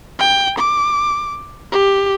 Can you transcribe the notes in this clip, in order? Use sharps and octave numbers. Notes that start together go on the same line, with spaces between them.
G5
D6
G4